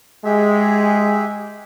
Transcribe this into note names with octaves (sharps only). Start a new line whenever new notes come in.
G#3 G4 G#4 E5